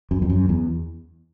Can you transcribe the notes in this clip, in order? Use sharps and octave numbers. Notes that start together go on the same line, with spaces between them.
F#2
F2
F#2
E2